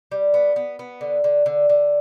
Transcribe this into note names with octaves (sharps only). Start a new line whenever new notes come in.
G3
B3
B3
B3
D3
D3
D3
D3